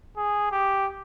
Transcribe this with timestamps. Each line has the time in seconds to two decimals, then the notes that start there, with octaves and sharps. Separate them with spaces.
0.17 G#4
0.51 G4